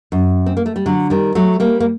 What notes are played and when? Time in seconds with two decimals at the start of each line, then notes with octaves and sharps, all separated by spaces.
0.12 F#2
0.46 C4
0.57 A#3
0.66 A3
0.76 G3
0.86 D3 F#3
1.10 D#3 G3
1.35 F#3 A3
1.60 G3 A#3
1.80 A#3